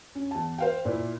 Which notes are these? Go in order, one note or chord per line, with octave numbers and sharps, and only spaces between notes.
C#4
E2 A5
C5 F5 G5
A#2 E4